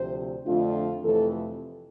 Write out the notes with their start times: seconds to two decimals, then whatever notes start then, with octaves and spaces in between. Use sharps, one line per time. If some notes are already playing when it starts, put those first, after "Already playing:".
Already playing: D2 C3 F3 C5
0.45 F2 D3 A3 D4 F4
1.03 F2 C3 E3 A3 A4